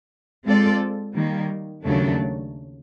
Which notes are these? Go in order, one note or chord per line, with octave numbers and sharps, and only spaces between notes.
G#3 C4 F4 A4 D5
D#3 G3 A#3
D#2 C#3 F#3 A3 D4